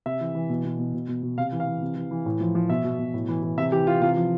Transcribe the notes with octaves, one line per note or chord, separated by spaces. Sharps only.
C3 E5
E3
E3
B2
B2
B2
B2
B2
B2
C3 F5
E3
F5
E3
C3
E3
E3
A2
F3
F3
B2 E5
B2
B2
A2
E3
E3
C3 E5
E3 G4
E3 F4
C3 F4
F3